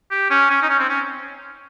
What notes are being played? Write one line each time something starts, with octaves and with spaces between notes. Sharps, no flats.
G4
C#4
C#4
D#4
C#4
C4
C#4